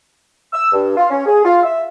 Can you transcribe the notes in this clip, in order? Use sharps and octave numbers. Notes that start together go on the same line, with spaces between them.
E6
G2
F4
C#4
G#4
F4
E5